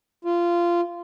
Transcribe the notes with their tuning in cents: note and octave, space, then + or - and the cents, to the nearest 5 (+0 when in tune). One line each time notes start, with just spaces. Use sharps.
F4 -15